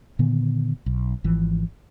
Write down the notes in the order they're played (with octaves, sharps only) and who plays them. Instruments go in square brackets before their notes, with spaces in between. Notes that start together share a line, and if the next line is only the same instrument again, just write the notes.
[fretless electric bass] A#2 D3 D#3 B3
B1
G#1 E3 F3